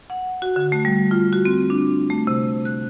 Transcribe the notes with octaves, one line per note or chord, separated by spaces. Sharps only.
F#5
F#4
D3
A3
G3
F4
F#4
C4
D4
A3
C3
F#6